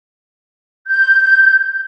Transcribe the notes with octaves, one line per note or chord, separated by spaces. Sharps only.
G6